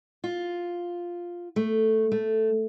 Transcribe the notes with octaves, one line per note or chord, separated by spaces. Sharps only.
F4
A3
A3